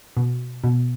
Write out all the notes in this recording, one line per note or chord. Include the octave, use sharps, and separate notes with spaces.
B2
B2